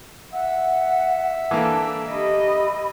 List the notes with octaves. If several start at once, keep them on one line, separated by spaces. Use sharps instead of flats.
E5 F#5
E3 A#3 D4 A4 A5
G4 D#5 B5